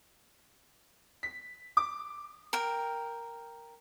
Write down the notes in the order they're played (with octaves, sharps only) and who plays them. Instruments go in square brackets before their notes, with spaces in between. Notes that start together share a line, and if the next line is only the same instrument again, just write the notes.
[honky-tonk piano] B6
D6
[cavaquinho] A#4 G5